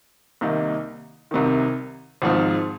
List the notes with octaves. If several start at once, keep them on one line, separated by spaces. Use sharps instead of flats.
C2 C3 D#3 A#3 D#4
C2 C3 D#3
G#1 G#2 F3 C4